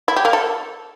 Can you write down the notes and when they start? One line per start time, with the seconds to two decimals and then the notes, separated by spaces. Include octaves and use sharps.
0.08 E4
0.16 G4
0.25 A#3
0.33 A4